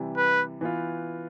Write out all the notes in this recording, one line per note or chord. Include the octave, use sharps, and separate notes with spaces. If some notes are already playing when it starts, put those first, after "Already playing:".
Already playing: C3 E3 G3
B4
E3 B3 F4